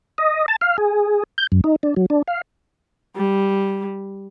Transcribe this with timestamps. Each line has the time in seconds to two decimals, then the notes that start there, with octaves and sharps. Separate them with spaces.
0.18 D#5
0.48 A5
0.61 F5
0.78 G#4
1.38 G6
1.52 F#2
1.64 D#4
1.83 D4
1.96 F#3
2.10 D4
2.27 F5
3.17 G3